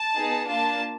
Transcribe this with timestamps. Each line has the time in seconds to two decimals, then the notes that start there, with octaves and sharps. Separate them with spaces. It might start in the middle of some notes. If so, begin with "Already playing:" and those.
Already playing: A5
0.16 B3 D#4 G#4
0.46 A#3 D4 F4 A5